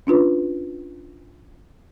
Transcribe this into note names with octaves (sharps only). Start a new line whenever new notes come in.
C#4 D4 F4 B4